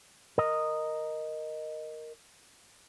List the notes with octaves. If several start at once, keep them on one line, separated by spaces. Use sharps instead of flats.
A#4 D#5